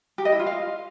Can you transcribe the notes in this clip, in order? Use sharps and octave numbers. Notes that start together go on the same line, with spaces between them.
G4
D#5
E4
F4
F5